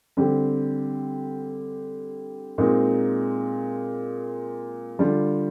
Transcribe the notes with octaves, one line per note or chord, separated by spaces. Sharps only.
D3 G3 C4 G4
A#2 G#3 C4 D#4
D3 G3 D4 F4